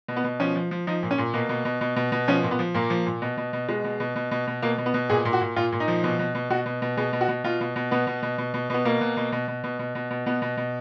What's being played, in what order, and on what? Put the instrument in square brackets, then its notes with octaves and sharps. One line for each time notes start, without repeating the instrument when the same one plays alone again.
[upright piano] B2
B3
B2
F3 C#4
F3
F3
F3 D#4
A#2
C#4
A#2
B2 A#3
B2
B2
B2
B2
B2
F3 C#4
A#2
B3
F3
A#2 A#3
F3
A#2
B2
B2
B2
B2 G#3
B2
B2
B2
B2
B2
B2 A#3
B2
B3
B2
A#2 G#4
A#2
F#4
A#2
A#2 F4
A#2
D#4
F3
B2
B2
B2
B2 F#4
B2
B2
B2 G#4
B2
F#4
B2
B2 F4
B2
B2
B2 B3
B2
B2
B2
B2
B2 B3
B2 A#3
B2
B2
B2
B2
B2
B2
B2
B2
B2 B3
B2
B2